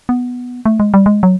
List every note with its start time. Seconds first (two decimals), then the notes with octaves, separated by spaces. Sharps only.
0.09 B3
0.66 A3
0.80 G#3
0.94 G3
1.06 G#3
1.23 F#3